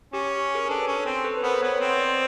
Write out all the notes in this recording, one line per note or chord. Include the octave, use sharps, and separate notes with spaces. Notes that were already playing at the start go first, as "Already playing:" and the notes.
C#4 G4
G#4 A#4
D4 A4 B4
C#4
C4
A4 B4
B4
B3 A#4 C5
B3 B4 C#5
C4 B4 C#5
C5 D5